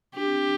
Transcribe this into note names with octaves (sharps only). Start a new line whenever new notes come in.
D4 G4
C4
D4